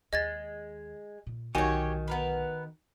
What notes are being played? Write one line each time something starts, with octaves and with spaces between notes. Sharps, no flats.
D#2 G#3 D#5 G#6 A6
A#2
B1 D3 D#3 F#4 G4 C#5 G#5
B3 A#4 B4